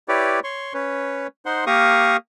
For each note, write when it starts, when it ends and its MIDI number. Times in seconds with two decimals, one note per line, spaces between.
0.09 0.40 64
0.09 0.40 67
0.09 0.40 71
0.09 0.40 73
0.09 0.40 74
0.44 0.73 73
0.44 0.73 84
0.44 0.73 85
0.74 1.27 61
0.74 1.27 71
0.74 1.27 73
1.46 1.65 63
1.46 1.65 72
1.46 1.65 78
1.46 1.65 84
1.67 2.17 58
1.67 2.17 67
1.67 2.17 70
1.67 2.17 77
1.67 2.17 85
1.67 2.17 87